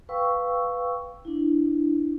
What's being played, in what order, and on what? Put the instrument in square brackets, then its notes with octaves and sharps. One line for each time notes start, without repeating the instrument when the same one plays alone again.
[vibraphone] B4 F5 G5 C#6 E6
D4 E4